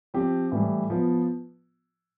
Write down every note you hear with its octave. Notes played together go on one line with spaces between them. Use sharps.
F3 C4 G4
A2 E3 G3
F3 B3 F4